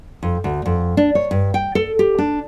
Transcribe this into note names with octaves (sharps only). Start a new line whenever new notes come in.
F2
D2
F2
D4
C#5
G2
G5
A4
G4
D4